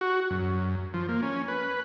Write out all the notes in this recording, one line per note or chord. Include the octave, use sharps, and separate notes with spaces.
F#4
F#2
F3
A#3
C#4
B4